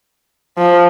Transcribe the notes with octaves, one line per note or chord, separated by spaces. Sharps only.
F3